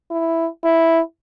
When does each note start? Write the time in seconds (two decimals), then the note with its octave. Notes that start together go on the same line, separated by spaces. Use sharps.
0.11 E4
0.64 E4